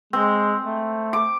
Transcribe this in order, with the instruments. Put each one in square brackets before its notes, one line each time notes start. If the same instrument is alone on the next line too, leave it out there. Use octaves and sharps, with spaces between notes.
[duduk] G#3 [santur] C4
[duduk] A3
[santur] D6